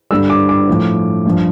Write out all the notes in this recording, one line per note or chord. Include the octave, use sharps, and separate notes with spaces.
G2 D3 G3 E6
D6
D6
A2 F3
G2 F3